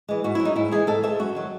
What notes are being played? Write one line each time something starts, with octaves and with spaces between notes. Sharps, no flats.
E3 G#3
G#2 F#4
F#3 E4
D#4
G#2 E4
E3 G#3 G#4
G#2 A4
E3 G#3 E5
F#2 F#4
D#3 F#3